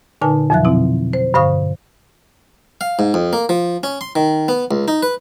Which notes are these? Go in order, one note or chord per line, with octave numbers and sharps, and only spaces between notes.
A#2 D3 D#4 B4 G#5 A5
F2 B2 F3 F#3 E5 F#6
B2 C4 E4
C5
G2 D3 C5 F5 C#6 D#6
F5
G#2
F2
A#3
F3
C#4
C6
D#3
B3
C#2
D#4
B4